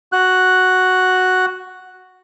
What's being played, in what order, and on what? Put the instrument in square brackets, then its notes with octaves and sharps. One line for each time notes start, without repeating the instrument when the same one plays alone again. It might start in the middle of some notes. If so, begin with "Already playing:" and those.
[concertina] F#4 F#6